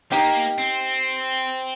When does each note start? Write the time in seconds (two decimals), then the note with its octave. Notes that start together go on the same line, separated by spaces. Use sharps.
0.11 A#3 D#4 G4
0.58 C4